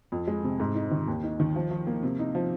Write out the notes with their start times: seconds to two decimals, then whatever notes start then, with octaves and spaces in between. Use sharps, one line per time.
0.12 F2
0.27 G#3
0.44 C3
0.60 G#2
0.75 D#4
0.91 D#3
1.08 D#2
1.23 D#4
1.40 D#3
1.56 F3
1.71 F3
1.87 A#3
2.03 C3
2.19 D#4
2.35 F3